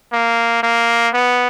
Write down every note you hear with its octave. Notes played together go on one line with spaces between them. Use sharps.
A#3
A#3
B3